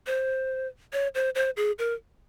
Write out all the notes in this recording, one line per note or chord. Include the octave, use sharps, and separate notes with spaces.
C5
C#5
C5
C5
G#4
A#4